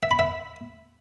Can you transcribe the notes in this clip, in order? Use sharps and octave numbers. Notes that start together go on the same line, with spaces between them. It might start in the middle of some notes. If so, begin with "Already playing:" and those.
E5
B5
E5